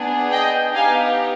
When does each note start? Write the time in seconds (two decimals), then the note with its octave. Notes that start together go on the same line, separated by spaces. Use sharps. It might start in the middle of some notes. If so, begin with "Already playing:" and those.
Already playing: B3 D4 G#4
0.32 D#5 G5
0.74 B3 D#4 G4 F5 G#5